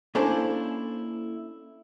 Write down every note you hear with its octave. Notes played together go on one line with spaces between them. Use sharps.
A#3 C#4 D4 E4 A4 C5